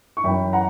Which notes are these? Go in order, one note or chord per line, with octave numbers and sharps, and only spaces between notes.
C#6
F#2 E3 G5 B5
F#5 A#5